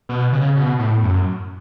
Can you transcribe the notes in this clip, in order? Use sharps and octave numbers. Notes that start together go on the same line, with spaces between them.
B2
C#3
B2
A2
F#2